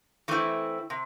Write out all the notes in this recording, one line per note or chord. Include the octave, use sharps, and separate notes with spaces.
E3 A3 C4 E4
C3